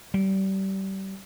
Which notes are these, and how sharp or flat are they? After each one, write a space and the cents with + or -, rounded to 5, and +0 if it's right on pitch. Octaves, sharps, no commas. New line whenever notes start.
G3 -30